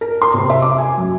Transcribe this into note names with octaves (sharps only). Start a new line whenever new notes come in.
A#4
C6
C3
E5
D6
G#5
F#2